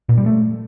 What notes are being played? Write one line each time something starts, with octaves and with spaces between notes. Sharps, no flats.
A#2
G3
A3